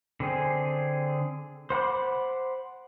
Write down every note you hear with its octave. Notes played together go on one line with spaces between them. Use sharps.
D3 C4 G#4
C5 F#5 B5 D6